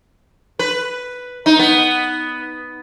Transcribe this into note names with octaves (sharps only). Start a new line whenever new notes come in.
B4
D#4
B3